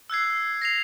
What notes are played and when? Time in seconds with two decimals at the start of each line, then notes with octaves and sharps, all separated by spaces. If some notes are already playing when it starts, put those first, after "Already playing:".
0.10 E6 F#6 G#6 C7
0.62 A#6 C7 F7